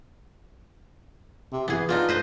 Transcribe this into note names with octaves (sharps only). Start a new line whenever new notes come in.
C3
E3 B3 G#4
B3 D4 D#4 F4
B4 C5 D#5